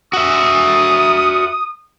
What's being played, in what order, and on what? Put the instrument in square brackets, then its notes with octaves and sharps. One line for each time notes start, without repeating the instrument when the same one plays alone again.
[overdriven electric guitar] F#4 E5 [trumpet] D#6